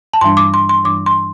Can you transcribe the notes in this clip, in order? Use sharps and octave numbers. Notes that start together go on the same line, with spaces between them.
A5
G2 E3 G3 D4 C6
D6
C6
C6
G2 E3 G3 D4 D6
C6